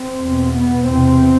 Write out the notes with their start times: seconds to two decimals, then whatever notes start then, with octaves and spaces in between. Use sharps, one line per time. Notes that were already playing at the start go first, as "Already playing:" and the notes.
Already playing: C4
0.21 E2 B2
0.54 B3
0.86 E2 C3 C4